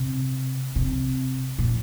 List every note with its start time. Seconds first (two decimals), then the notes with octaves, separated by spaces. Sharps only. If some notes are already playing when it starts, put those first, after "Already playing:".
Already playing: C3
0.76 C3
1.59 A#2